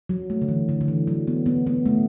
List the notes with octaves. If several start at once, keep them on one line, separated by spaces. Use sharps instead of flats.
F#3
A3
D3
E3
D3
D3
E3
F#3
B3
B3
B3
A3